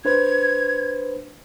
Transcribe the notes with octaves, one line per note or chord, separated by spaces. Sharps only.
D4 B4 C5 G#6